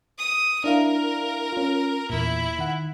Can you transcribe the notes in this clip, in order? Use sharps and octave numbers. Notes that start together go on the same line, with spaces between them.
D#6
D4 E4 A#4 F5
C#4 F4
E2 A#2 E4
D#3 F#5